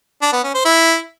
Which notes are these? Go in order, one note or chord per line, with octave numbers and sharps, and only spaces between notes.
D4
B3
C#4
C5
E4